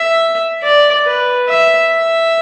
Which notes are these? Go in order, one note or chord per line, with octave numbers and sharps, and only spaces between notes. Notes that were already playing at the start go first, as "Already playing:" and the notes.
Already playing: E5
D5
B4
E5
E5